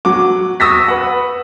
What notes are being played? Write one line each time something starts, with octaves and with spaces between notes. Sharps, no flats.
F#3 F#5 D6
C#6 D#6 E6 A#6 B6
B4 F#5